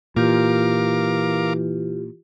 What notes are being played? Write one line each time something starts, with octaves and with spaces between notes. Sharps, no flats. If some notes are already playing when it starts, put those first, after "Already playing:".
A#2 E3 F4 G4 A#4 F5 D6